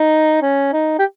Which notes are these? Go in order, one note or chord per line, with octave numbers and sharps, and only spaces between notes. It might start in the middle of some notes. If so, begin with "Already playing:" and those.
Already playing: D#4
C#4
D#4
G4